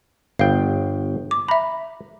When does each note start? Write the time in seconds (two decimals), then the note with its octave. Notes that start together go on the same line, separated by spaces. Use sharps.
0.39 G1 B3 F5 G5
1.31 D6
1.48 E5 A#5 B5